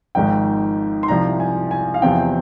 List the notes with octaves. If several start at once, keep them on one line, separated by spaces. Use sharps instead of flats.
G#1 G#2 F3 G5
C6
C2 C3 F3 A#5
G#5
G#5
F5
E2 C3 F3 C4 G5